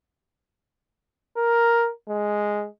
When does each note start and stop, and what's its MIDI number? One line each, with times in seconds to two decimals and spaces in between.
1.37 1.90 70
2.09 2.66 56